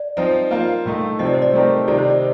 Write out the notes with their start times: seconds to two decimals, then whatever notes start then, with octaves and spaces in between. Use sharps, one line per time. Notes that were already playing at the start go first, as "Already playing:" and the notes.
Already playing: D5
0.17 F3 C4 D#4
0.51 A#3 F4 C5
0.85 A2 A3 D#4
1.19 C3 F3 C4 D#5
1.27 D5
1.34 C5
1.42 D5
1.54 A3 C4 D#4 G4 A#4
1.88 C3 D#3 G3 C4 D#4 D5
1.98 C5
2.10 D5